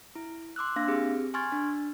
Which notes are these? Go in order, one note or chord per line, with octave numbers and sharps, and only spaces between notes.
E4
C6 D6 E6 F#6
A#3 D4 F5 A#6
C4 G4 G#4
G#5 C6 C#6 F6 G#6 A6
D4